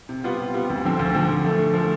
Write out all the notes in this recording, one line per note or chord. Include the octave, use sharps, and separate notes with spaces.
C3
G3 B3 F4
C3
G3 B3 F4
D2
D3 F3 C4
D2
D3 F3 C4
D3
F3 A3
D3
F3 A3